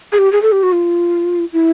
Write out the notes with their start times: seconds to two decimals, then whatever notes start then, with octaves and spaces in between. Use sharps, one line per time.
0.12 G#4
0.18 G4
0.32 G#4
0.42 A4
0.52 G4
0.63 F#4
0.72 F4
1.53 E4